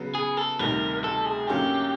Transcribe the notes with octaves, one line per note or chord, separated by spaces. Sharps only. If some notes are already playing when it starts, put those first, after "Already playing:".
Already playing: C#3 F#3 B3
G#4
A4
D2 C3 D#3 G3 A#4
A4
G#4
F#2 D3 F#3 A#3 C#4 G4